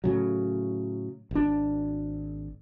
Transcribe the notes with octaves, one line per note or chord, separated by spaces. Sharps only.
A2 C#3 F#3
G#1 D4